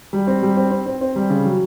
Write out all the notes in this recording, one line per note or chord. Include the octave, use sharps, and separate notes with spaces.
G3
C4
G3
C4
C4
C4
C4
G3
C#3
F#3